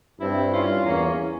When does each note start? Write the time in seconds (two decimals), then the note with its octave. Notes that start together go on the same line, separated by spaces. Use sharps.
0.20 G2 C4 E4
0.53 C#4 F4
0.85 E2 A#3 C#4